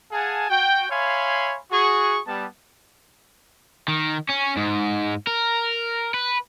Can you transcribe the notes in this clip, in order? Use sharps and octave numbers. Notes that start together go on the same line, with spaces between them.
G#4 F5 F#5 G#5 A5
F#4 G5
C#5 E5 F5 G#5 B5 C6
F#4 G#4 C#6
G3 B3 A5
D#3
C#4
G#2
A#4
B4